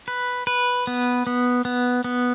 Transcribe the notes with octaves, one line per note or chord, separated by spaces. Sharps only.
B4
B4
B3
B3
B3
B3